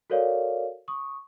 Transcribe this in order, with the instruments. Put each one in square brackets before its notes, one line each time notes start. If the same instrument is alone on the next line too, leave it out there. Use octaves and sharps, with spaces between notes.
[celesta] F#4 A4 A#4 C#5 D5 F5
C#6 D#6